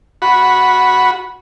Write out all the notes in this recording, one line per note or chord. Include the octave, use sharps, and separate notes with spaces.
F#4 B5